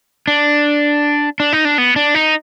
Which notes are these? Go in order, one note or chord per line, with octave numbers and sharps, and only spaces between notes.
D4
D4
D#4
D4
B3
D4
D#4